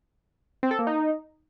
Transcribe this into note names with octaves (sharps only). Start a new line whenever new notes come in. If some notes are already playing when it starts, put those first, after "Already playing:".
C4
A4
A#3
D#4